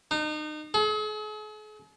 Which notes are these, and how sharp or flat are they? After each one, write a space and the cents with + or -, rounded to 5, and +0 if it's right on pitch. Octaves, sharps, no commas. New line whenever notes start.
D#4 -35
G#4 +45